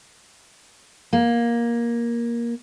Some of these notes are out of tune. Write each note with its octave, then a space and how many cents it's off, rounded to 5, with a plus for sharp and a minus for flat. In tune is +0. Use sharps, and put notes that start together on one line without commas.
A#3 +15